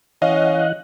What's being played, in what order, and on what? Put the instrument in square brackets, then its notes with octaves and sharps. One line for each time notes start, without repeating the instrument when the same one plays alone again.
[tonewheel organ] E3 F#5 [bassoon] C#4 [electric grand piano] D#5 F5